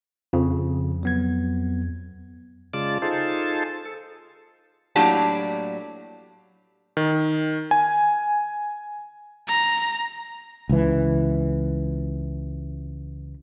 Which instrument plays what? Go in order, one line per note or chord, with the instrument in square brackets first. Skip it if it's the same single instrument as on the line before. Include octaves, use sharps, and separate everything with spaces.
[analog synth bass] F2 [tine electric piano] C#3
[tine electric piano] F#3 B3 G#6
[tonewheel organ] C#3 G#3 F4 D5 A5 D6
D#4 F4 G#4 A4 C5 A5
A4
[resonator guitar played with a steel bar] A2 F#3 A#3 D4 G4 A5
[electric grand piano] D#3
G#5
[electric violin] A#5
[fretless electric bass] C#2 E3